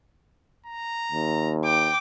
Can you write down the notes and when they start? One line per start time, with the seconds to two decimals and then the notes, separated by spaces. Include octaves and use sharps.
0.66 A#5
1.12 D#2
1.65 G5 D6